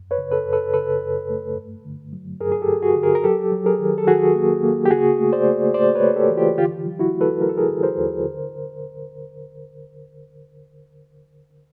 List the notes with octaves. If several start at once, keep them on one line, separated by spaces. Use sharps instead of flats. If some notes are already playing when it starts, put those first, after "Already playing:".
Already playing: F#2
B4 C#5
C#3
A4 B4
F#2
A4 B4
C#3 A4 B4
F#2
A3
G2
D3
F#3
G2 G#4 A#4
G#4
G4 A4
G2
F#4 G#4
D3
G#4 A#4
A#4
F#3 G4 A4
F#3
G#4 A#4
D#3
A4
D#3 F#4 G#4
A#3
A#3
G4
C#3 F#4 G#4
A3
C5 D5
A3
A3 C5 D5
B4 C#5
A3
G4 A4
E3
F4 G4
D3 F4 G4
F#3
E4 F#4
A3
A4 B4
F#3 A#4
A4
G#4 A#4
D3
A#4 C5
D#2
D3